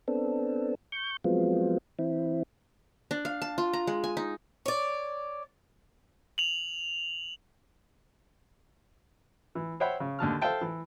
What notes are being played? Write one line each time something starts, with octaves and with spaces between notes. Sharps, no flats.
B3 C4 D4 A4
C#6 G6
F3 F#3 G#3 B3 C4 F4
E3 C4 E4
D4
F5
A5
F4
A#5
G#3
G#5
D#4
C#5 D5
F7 F#7
E3
C5 C#5 E5 F#5 G5 B5
C#3
D#2 D3 A5 F6
A4 C5 E5 F5 G5 A5
E3